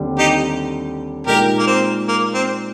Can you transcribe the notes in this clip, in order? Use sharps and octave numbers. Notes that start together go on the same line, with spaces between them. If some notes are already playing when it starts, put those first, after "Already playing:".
Already playing: D#2 D3 G3 C4
D#4 G4
A#2 G#3 D#4 G4 A#4
A#3
C4
A#3
C4